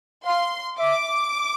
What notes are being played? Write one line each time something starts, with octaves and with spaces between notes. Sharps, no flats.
F5 C6
E5 D6